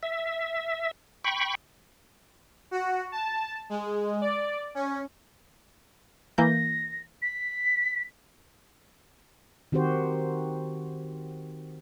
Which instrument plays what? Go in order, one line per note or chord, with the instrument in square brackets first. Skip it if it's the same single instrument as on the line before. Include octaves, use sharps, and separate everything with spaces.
[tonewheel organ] E5
G5 B5 C#6
[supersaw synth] F#4
A5
G#3
D5
C#4
[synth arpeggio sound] E3 A#3 G6 [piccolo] A#6
[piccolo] B6
[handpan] D#3 C4 F#4 G4 C5